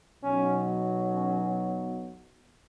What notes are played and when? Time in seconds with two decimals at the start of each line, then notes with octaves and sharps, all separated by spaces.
0.22 B1 B2 F#3 C#4
1.11 C#4